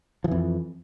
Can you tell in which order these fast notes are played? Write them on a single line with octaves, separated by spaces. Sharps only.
F3 E3 F2